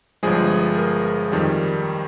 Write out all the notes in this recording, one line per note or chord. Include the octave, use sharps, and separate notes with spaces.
G1 G2 F3 G#3 G#4
A#4
F2 D#3 G3